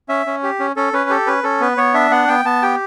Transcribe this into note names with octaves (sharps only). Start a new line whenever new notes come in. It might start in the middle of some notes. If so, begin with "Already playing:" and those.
C#4 E5
C#4
G4
C#4
C#4 A4
C#4 B4
G4 A4
C#4 B4
C#4 A4
B3 B4
B3 C#5
D4 E5
B3 F#5
B3 G5
B3 A5
G4 G5